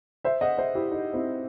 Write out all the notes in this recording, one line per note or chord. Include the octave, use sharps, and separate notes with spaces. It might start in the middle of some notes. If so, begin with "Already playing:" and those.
C5 E5
D#5 F#5
C5 E5
E4 G4
D#4
C4 E4